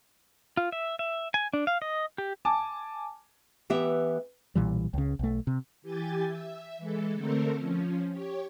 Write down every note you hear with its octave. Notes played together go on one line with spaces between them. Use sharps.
F4
E5
E5
G#5
D4
F5
D#5
G4
G#5 A5 D6
E3 B3 G4 E5
B1 A#2 E3 G3
C#2 C#3
B1 A3
C3
E3 G4 G#5 G6 A6
E5
E3 G#3 A4
D3 A3 C4 A4 A#4
F3 C#4
G4 C#5